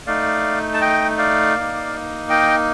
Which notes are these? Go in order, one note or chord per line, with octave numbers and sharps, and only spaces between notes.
A3 D#4 D5 F5
A5
D#5 G5
D5 F5
A#3 D#4
D#5 G5